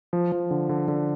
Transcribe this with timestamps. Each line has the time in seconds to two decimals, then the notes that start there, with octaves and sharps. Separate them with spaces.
0.13 F3
0.32 F3
0.51 D3
0.69 D3
0.88 D3